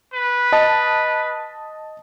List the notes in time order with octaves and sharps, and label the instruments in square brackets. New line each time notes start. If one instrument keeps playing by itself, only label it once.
[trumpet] B4
[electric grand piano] D#5 A5